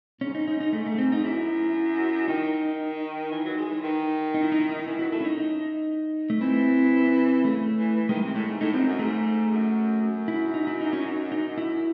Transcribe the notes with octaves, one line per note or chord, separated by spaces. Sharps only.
G#2 C#4
D#4
D#4
D#4
A3
A3
C4
D#4
F#2 E4
D#3 D#4
E3
F#3
G#3
E3
D#3
D#4
E4
D#4
E4
D#4
E3 E4
F#3 E4
A3 E4
C#4
D#4
D#4
A3
E3 C4
C#3 A3
E3
E3
D#3 G#3
C3 G#3
A2 A3
G#2
A2 D#4
F#2 C4
F#2
G#2 A3
F#2
F#2
E4
D#4
E4
D#4
C#4
E4
D#4
D#4
E4